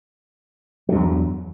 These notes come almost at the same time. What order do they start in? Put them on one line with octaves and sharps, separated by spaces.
F#3 G2 E2